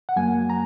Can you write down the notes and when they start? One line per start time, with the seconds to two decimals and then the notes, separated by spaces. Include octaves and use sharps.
0.09 F#5
0.16 F#2 F#3 A#3 G#5
0.50 A#5